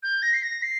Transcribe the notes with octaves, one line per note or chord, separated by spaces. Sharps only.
G6
A#6
C7
A#6
C7